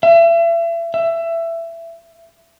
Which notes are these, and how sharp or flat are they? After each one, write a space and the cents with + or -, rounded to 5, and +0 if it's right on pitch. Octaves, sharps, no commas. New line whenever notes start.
E5 +35
E5 +20